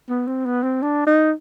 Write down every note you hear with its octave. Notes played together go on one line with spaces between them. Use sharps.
B3
C4
B3
C4
D4
D#4